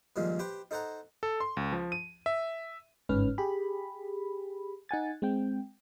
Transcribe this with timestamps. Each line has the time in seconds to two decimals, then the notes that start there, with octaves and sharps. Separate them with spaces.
0.16 G2 A#2 D#3 F3 G#3
0.39 G4 B4 C5 G5
0.71 D#4 A4 C5 F#5 A#5
1.23 A4
1.40 C6
1.57 C#2
1.72 F3
1.92 D#7
2.26 E5
3.09 G1 G#2 C#4 B4 F6
3.38 G4 G#4 B5
4.89 D#4 F#5 G#5 A6
5.22 G#3 C4 G5